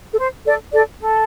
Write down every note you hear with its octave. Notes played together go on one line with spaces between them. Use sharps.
A4
C5
A4 D5
A4 D5
A4